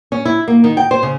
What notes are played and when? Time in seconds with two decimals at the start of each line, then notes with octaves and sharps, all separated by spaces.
0.12 C#4
0.25 E4
0.48 A#3
0.64 D#3
0.77 G5
0.91 C5
1.03 C#3